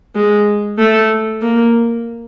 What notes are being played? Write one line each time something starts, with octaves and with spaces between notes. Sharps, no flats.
G#3
A3
A#3